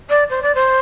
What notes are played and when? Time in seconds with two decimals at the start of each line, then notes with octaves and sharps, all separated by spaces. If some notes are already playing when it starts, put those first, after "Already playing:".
0.10 D5
0.30 C5
0.43 D5
0.55 C5